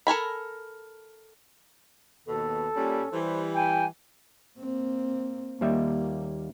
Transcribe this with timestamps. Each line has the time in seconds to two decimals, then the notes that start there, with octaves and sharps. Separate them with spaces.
0.07 A4 A#4 G#5 B5
2.26 D#2 B2 A4
2.76 A#2 G3 C#4
3.12 E3 G3 C5
3.55 G5 G#5
4.59 A#3 C4
5.61 D#2 G3 A#3 E5